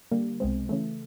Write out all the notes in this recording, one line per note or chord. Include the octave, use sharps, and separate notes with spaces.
D3 G3 A#3
C2 B2 G#3 C4
C#3 E3 A3